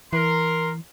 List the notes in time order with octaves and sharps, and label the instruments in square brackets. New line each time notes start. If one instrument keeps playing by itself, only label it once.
[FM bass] E3 [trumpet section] A#4 [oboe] C6